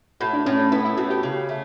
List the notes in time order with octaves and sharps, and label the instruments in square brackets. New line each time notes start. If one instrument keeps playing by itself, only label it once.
[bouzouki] A2 [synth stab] F#4
[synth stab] D4
[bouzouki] A2 [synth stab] C#4
[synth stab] C#4
[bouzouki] B3 [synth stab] E4
[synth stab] E4
[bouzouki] A2 [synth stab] F#4
[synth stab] G4
[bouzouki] C#3
A3